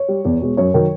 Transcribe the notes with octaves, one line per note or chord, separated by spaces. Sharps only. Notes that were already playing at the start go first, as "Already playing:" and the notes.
Already playing: C#5
G3
E2
B2 G#3
F#2 C#5
D#3 F#3